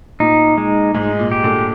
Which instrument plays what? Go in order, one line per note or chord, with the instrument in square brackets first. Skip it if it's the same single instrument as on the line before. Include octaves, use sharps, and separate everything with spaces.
[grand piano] A#2 [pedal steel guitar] D#4
[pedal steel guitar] G#3
[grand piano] G#2 [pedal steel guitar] G#3
[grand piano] A#2
[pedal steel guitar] G4
[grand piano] A#2 D3